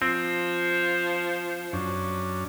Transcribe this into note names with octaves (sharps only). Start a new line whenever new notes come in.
F3 C4
F#2 C#4 D4